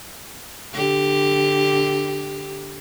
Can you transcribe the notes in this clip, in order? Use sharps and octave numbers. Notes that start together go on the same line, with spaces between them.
D3 G4